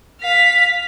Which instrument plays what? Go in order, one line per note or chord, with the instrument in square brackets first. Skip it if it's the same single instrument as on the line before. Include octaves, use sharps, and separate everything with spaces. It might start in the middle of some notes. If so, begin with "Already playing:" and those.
[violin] F5 B6